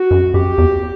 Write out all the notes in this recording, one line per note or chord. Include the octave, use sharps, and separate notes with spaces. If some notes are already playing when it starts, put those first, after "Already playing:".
Already playing: F#4
F#2
F#2 G4
E2